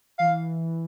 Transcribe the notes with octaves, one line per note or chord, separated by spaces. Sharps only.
E3 F5